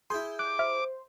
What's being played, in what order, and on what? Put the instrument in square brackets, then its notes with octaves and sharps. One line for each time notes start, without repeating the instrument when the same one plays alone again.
[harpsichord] E4 G#4 [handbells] C6 [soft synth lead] G6
[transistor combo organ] D6 [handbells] F#6
[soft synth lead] C5 [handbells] E5 F6